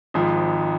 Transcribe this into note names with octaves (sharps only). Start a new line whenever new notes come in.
G#1 G#2 F3